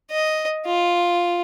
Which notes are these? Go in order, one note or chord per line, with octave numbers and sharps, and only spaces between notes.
D#5
F4